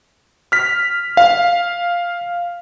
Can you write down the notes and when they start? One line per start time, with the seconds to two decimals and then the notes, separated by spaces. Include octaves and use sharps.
0.52 F6 B6
1.17 F5